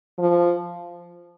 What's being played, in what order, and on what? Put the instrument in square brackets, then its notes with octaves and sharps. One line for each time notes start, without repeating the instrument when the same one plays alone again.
[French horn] F3